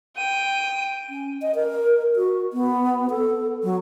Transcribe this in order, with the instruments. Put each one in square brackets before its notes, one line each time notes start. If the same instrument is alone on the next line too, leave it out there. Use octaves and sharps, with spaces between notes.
[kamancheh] G5 [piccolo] D#7
[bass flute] C#4
D#5
A#4
F#4
B3
A4
F#3